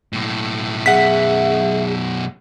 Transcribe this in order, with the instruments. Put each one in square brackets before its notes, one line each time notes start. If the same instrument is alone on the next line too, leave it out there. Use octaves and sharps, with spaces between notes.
[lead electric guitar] B1 A2
[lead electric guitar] F#2 B2 [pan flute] G#4 [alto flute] E5 [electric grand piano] F#5 B6